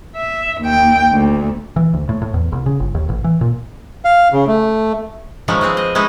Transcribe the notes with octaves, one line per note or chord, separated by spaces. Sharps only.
E5
D#2 G5
D2
E3
D2
A2
A2
E2
C2
C#3
G1
D#2
A1
E3
A#2
F5
C#3
A3
D#3 F3 F#3 G#3 B3 C#4
F3 B3 C4 G#4
D#5
G#3 B3 C#4 D#4 E4 D#5